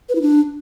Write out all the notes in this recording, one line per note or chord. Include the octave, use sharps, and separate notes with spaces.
B4
E4
D4